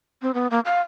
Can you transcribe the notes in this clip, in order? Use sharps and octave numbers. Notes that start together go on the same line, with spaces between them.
C4
B3
A#3
F5